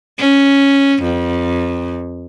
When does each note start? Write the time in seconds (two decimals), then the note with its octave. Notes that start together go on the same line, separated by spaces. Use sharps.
0.19 C#4
1.03 F2